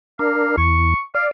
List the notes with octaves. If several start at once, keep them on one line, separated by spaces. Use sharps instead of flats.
D4 A#4 F5
E2 C#6
D5 F5